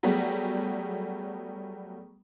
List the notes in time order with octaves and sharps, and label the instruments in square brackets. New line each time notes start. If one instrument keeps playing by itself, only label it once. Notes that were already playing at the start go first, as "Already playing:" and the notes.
[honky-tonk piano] F#3 G3 A3 B3 G#4